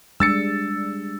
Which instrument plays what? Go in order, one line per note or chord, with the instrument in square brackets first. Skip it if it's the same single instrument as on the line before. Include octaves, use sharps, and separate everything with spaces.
[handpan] G3 G#3 D4 [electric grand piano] E6 A6 C#7